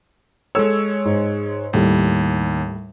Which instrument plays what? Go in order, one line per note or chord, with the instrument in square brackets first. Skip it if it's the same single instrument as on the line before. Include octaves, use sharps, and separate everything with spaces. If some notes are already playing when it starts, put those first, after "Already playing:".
[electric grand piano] G#3 C#5 [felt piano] A4 E6
[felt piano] G#2
[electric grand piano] D#2 [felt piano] A2 G3